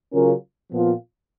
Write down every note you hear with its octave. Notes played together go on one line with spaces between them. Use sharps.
C#3 F#3 C#4 F4 A#4
A#2 F3 B3 F4